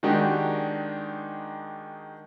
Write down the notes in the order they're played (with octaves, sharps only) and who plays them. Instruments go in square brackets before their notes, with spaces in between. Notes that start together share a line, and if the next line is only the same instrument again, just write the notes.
[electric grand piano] D#3 G#3 D4 D#4 F#4 G4